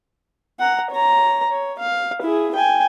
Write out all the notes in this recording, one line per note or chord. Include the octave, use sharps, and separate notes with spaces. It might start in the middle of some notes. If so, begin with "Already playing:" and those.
F#5 A#5
C#5 A#5
C#5
F5
E4 G#4
G5 G#5